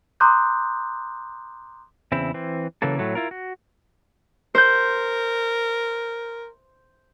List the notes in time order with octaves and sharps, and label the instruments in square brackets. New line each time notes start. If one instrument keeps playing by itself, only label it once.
[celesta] A#5 C6 D6 D#6 F#6 G6
[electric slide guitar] E2 C#3 C4 E4
E3 C4
C#3 E3 F#3 A#3 A4
A2 F#3 A3
E4 F4 A#4
F#4
[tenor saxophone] A#4 [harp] C5 G6